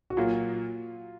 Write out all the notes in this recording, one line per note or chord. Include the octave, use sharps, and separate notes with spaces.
F#4
A#2 F#3 A#3 F4